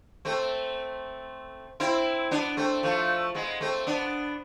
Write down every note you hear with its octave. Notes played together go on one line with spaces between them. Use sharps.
A3 C4
C4 E4
B3 D4
A3 C4
F3 A3
G#3 B3
A3 C4
B3 D4